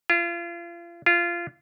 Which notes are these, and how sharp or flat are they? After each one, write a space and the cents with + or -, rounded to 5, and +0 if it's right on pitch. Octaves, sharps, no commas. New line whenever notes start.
F4 -35
F4 -20